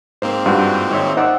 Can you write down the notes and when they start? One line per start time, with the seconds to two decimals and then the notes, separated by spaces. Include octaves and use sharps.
0.22 G#2 A#3 C4 C5
0.46 G2 F4 F#4
0.91 G#1 D#4 C#5 E5
1.17 D#4 C5 D5 F#5 E6